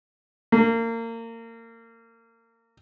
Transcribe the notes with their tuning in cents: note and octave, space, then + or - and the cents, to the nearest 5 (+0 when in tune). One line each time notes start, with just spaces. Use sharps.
A#3 -30